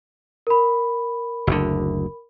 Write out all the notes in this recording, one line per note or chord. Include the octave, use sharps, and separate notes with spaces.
A#4 B5
F#1 D2 D3